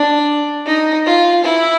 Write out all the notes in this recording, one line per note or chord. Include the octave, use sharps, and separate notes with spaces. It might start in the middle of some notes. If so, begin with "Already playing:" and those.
Already playing: D4
D#4
F4
E4